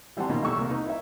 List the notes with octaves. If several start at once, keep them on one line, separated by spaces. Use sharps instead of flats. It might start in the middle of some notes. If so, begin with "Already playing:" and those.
E3 G3 C4 F#5 A5 C6
B2 D#3 A#3 C#4 D#4 F4
E2 G3 A3 C#6 E6
C2 A#3
D#4 B4
E4 E5